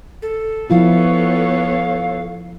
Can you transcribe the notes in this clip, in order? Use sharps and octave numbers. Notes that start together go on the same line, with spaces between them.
A4
F3 B3 E4 F4 C#5 F5